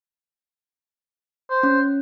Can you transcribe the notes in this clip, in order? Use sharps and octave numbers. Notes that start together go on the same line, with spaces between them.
C5
C#4